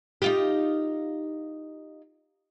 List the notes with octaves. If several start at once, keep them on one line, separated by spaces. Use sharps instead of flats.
D#4 F4 G4